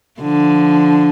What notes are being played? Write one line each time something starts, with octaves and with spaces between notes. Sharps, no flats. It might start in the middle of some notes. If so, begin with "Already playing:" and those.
D3 F3